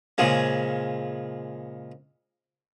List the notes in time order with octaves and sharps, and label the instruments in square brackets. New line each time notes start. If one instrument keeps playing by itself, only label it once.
[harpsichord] A#2 C#3 F3 G#3 C#4